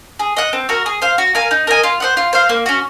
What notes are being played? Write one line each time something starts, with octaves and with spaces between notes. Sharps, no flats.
G#4
D#5 F#5
C4
F#4 A#4
G#4
C5 F5
F#4
A#4 F5 G#5
D#4
A#4 D#5 G#5
F4
C5 D#5 F#5
F4
C5 F5
A#3
C#4 F#4